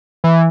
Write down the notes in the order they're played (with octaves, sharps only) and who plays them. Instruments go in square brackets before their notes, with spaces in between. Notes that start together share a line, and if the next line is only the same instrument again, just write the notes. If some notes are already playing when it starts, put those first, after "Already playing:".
[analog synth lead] E3